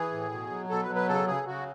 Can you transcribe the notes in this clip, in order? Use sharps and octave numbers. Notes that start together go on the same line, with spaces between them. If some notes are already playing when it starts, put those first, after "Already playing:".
Already playing: E3 G#4
A2
B2
F#3
B2 A4
B4
F#3
B4
C#3 A4
C#3 G#4
C#3 F#4